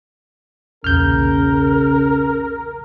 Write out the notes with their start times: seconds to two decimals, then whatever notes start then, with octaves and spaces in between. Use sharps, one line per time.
0.84 B1 E2 A#2 C#3 A#4 F6 G6